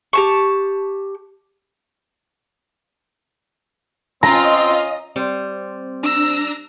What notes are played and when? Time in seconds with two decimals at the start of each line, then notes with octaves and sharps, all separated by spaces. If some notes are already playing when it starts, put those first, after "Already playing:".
0.13 G4 A5 C#6
4.23 C4 C#4 F4 D#5 A#5
5.16 G3 C4 C5
6.03 D4 A#5 E6 A#6